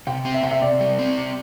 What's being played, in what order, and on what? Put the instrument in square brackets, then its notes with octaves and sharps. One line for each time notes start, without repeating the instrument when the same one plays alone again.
[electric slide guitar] C3 [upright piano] G5
[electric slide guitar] C4
[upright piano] E5
[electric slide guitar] C3 [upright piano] G5
[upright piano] E5
[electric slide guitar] C3 [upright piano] D5
[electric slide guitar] G3
C4
C3